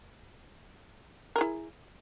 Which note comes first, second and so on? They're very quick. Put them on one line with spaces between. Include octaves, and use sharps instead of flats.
A#4 G#4 E4